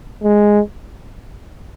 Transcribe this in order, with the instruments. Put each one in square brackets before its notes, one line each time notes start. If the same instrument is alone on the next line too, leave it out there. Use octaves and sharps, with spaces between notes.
[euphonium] G#3